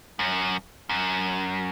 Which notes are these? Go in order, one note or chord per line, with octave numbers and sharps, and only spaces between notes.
F#2
F#2